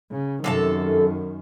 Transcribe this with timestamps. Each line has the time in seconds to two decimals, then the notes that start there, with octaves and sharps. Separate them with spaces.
0.12 C#3
0.44 F#2 C3 D#3 A4 A5